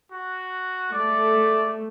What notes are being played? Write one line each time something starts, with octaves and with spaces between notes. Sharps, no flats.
F#4
A3 D5